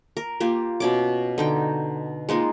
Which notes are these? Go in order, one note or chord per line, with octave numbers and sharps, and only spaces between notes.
A#4
A#3 F4 G4
B2 C#4 D6
D3 D#4 G5
G#3 A#3 D#4 F4